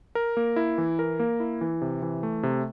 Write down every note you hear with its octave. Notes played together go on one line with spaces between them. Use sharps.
A#4
A#3
E4
E3
A#4
A#3
E4
E3
C3
E3
A3
C3